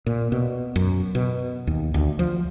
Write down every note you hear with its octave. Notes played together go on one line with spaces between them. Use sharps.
A#2
B2
F#2
B2
D#2
D2
F3